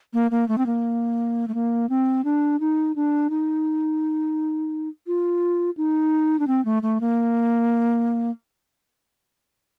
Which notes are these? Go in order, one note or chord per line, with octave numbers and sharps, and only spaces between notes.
A#3
A#3
A3
C4
A#3
A3
A#3
C4
D4
D#4
D4
D#4
F4
D#4
D4
C4
A3
A3
A#3